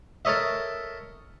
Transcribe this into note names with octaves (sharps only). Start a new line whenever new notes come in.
A4 A#4 C#5 D#5 E5